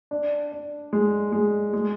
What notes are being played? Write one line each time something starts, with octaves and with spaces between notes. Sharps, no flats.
D4
D4
G#3
G#3
G#3